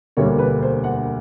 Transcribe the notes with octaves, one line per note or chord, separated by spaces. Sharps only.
E1 D2 D3 G3 A#3 C#5
B4
C5
F#5